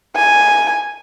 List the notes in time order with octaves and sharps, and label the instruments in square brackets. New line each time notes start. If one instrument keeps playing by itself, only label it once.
[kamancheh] G#5